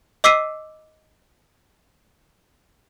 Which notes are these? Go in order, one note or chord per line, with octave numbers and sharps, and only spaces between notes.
D#5 D6 E6 B6 C7 D#7